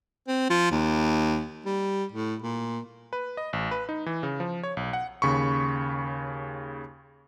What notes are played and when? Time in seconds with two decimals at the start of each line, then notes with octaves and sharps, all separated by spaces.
0.28 C4
0.50 F3
0.71 D#2
1.66 G3
2.12 A2
2.42 A#2
3.13 B4
3.37 D#5
3.53 A1
3.71 B4
3.89 D#4
4.06 E3
4.23 C#3
4.40 F3
4.63 C#5
4.77 B1
4.93 F#5
5.22 D#2 C#3 B5 C#6